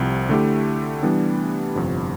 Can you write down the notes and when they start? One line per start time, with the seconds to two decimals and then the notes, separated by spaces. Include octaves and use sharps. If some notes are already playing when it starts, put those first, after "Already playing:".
Already playing: C2 C3 F3
0.29 D3 A3 E4 G4
1.02 E3 G3 B3 D4
1.75 G1 F2 C3